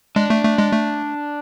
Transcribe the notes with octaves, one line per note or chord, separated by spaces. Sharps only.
G#3 D4
A3
A3
G#3
A3